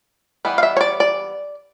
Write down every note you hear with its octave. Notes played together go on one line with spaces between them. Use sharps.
E3 G3 B3
F5
E5
C#5
D5
D5